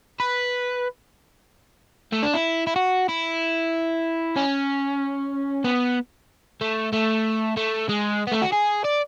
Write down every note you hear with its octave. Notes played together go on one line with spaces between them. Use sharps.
B4
A3
D4
E4
E4
F#4
E4
C#4
B3
A3
A3
A3
G#3
B3
A3
F#4
G#4
D5